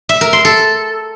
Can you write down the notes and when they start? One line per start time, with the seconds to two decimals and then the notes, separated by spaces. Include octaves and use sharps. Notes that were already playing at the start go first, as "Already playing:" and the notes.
0.09 E5
0.21 A#4
0.33 C6
0.45 A4